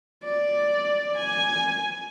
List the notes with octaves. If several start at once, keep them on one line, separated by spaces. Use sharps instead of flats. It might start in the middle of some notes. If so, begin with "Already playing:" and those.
D5
G#5